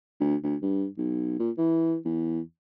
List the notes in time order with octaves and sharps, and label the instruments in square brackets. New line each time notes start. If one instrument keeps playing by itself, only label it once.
[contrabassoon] D2
D2
G2
B1
A#2
E3
E2